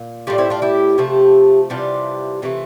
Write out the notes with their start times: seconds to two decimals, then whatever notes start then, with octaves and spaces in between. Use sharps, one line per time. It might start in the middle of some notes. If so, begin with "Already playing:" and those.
Already playing: A#2
0.27 A2 G3 D4 F4
0.38 C4 E4
0.50 D4 F4
0.62 E4 G4
0.98 C3 F3 A3
1.70 C3 E3 G3 D4 F4
2.42 C3 E3 A3